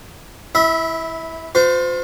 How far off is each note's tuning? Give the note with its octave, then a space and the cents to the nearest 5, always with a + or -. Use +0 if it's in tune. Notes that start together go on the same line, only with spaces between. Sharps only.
E4 +0 E5 -25
F4 +35 C5 -30